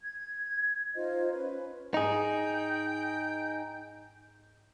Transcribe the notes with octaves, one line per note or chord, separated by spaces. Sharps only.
G#6
D#4 F4 C5 D#5
C#4 B4
G#2 D#4 G#4 G5